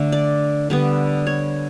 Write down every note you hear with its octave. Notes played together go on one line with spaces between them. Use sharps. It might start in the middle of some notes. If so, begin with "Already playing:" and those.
Already playing: D3 A3
D5
D3 G3 B3
C#5